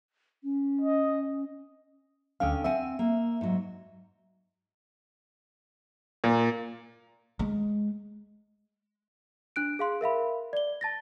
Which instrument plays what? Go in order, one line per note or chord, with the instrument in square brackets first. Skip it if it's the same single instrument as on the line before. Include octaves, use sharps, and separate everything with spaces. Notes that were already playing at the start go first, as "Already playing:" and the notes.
[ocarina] C#4
[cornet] D#5
[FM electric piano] D2 F5 [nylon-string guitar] D3 C#4 G5
[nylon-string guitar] C4 F#5 G#5 [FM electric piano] E5
[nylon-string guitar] A#3
G#2 F#3
[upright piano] A#2
[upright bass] G#3
[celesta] D4 F#6 D7
G#4 F5 C6
A#4 E5 F5 B5
D5 G7
A5 A6 A#6